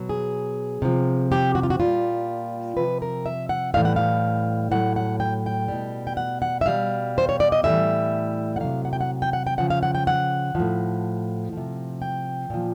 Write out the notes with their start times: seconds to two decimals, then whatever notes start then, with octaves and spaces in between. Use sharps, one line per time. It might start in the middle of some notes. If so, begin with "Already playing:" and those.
Already playing: B2 F#3
0.09 G#4
0.82 C3 F3
1.32 G4
1.55 F#4
1.63 F4
1.70 F#4
1.80 A#2 G3 F4
2.77 C3 F3 B4
3.02 A#4
3.26 E5
3.49 F#5
3.74 A2 E3 G3 F5
3.85 F#5
3.96 F5
4.71 A2 F#3 F#5
4.96 F#5
5.20 G5
5.46 G5
5.68 B2 G3
6.07 G5
6.17 F#5
6.42 F#5
6.61 E5
6.66 B2 G3 F5
7.18 C5
7.29 C#5
7.40 D5
7.52 D#5
7.63 A2 E3 G3 E5
8.56 F#5
8.60 C3 D#3 F#3 F5
8.85 F#5
8.93 G5
9.01 F#5
9.22 G5
9.33 F#5
9.47 G5
9.58 C#3 F3 F#5
9.70 F5
9.83 F#5
9.95 G5
10.07 F#5
10.55 A2 F3
11.52 C3 F3
12.02 G5
12.50 A#2 F3